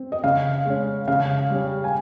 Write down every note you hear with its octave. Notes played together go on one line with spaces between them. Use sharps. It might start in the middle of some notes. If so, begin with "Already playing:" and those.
Already playing: C4
D#5
C#3 F5
G#3 C#4
C#3 F5
G3 C#4
G#5